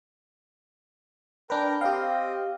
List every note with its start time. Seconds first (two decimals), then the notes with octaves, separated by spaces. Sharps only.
1.50 D4 A#4 B4 G5 A#5
1.81 C4 G4 D#5 F5 G5